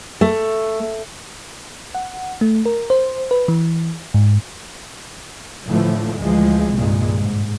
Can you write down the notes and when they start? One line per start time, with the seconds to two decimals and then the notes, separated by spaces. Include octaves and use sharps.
0.21 A3
1.95 F#5
2.41 A3
2.66 A#4
2.90 C5
3.31 B4
3.48 E3
4.14 G#2
5.67 A2 D3 E3 F3 A3
6.19 D2 E3 F3 G#3
6.74 C2 G2 A#2 D#3 G#3
7.22 G#2